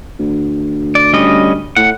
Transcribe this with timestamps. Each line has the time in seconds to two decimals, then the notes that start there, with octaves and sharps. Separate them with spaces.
0.19 D2
0.95 D5
1.13 G3 C#4 D#5
1.76 A2 F#5